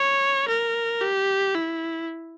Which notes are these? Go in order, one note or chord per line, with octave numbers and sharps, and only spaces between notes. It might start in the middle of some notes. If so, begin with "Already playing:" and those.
Already playing: C#5
A#4
G4
E4